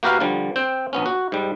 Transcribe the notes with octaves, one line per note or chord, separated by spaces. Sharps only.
A#3 F#4 G4 A#4 B4 F5
D3 F3 G3
C4 G5
A#1 B3 C#4
F#4
G#2 G3